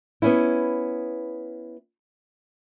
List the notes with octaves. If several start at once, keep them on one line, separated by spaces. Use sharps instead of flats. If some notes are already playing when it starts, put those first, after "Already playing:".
B3 C#4 E4